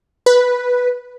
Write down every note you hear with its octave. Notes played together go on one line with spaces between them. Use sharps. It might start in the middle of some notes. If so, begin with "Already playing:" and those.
B4